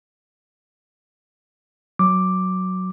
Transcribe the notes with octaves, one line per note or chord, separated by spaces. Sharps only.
F#3 D6